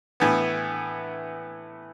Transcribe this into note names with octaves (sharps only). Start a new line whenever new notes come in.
A2 E3 B3